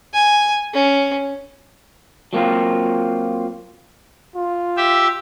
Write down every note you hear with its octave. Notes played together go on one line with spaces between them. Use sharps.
G#5
C#4
F#3 A#3 C4 F4
F4
G4 E5